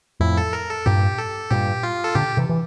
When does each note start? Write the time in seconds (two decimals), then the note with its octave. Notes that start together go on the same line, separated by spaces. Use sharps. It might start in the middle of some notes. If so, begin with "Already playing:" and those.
0.20 F2 A2 E4
0.37 A4
0.53 A#4
0.70 A4
0.86 G2 A#2 G4
1.18 A4
1.51 G2 A#2 G4
1.83 F4
2.04 A4
2.15 A#2 D3 G4
2.37 C3 E3
2.49 E3